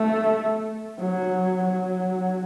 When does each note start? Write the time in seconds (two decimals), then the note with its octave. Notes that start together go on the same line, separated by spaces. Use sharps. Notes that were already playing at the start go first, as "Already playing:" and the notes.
Already playing: A3
0.99 F#3
1.64 F#3